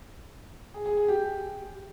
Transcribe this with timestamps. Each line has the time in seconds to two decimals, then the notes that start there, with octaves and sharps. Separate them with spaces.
0.74 G#4
0.86 G#4
0.97 G#4
1.08 G4